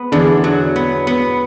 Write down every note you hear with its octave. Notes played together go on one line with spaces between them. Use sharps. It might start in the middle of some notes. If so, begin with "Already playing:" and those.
Already playing: B3
E2 D3 D4
F#3
B3
B3